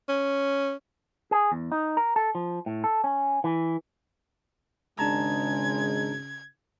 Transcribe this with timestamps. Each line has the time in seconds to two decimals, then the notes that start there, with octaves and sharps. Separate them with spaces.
0.09 C#4
1.31 G#4
1.52 E2
1.72 D#4
1.97 A#4
2.16 A4
2.35 F3
2.66 A2
2.84 A4
3.04 C#4
3.44 E3
4.99 G#1 C#3 G#3 D4 A5 A#5 G#6